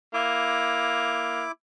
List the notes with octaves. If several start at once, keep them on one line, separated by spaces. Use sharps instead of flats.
A#3 E4 D6